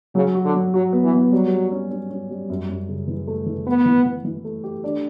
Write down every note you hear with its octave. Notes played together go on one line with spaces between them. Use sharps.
C#3 F#3
F#4
D3
F#3
F#3 F#4
B3
E3
B3
F#3 G3
G3
C#4
C#4
C#4
G3
F#2
F#2
C#3
E3
A3
E3
A3 B3
E3
E3
E3
A3
G4
D4